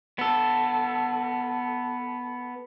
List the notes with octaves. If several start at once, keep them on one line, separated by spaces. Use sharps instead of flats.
B3 A4